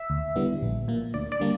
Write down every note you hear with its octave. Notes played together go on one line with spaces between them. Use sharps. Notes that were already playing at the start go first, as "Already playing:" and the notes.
Already playing: E5
D2
D3 G3 B3 E4
A#1
A#2 A#3
D2 D5
D5
D3 G3 A#3 D4